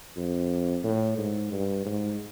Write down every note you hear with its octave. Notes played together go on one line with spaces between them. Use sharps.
F2
A2
G#2
G2
G#2